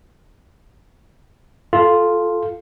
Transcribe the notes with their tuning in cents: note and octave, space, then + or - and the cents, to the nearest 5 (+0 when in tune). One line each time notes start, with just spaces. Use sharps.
F4 +0 A4 -10